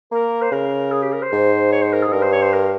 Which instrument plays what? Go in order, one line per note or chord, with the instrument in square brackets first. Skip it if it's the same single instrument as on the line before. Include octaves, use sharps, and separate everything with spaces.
[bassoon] A#3 [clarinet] A#4
[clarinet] C5
[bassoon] C#3 [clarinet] A#4
[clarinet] G#4
G4
A#4
C5
[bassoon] G#2
[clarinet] C#5
C5
A#4
G#4
[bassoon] G#2
[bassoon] G2 [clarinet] A#4
[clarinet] C5
C#5
C5
A#4